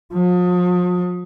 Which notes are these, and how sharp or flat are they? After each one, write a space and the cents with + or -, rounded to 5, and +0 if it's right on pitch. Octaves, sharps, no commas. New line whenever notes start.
F3 +40